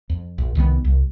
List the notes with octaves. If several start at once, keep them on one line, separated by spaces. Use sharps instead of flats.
F2
A#1
C2 D#3 F3 B3
C2